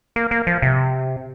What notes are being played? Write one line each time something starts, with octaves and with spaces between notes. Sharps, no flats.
A#3
A#3
F3
C3